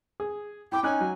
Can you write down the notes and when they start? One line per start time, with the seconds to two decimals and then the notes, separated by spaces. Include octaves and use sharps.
0.20 G#4
0.72 E4 G5 D6
0.83 C#4 D#4 G#5 F#6
1.01 F#3